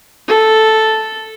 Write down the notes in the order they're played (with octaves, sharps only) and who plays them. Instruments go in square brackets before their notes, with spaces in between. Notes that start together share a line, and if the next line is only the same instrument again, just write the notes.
[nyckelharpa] A4